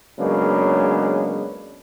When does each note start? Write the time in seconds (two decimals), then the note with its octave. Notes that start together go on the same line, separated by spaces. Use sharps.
0.19 C#3 F#3 G#3 A#3 B3 D4